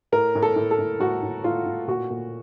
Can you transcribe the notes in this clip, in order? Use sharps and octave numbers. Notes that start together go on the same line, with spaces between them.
A2 A#4
A2
A4
A2
A4
A2
A2 F#4
A2
A2 F4
A2
A#2 F#4
A#2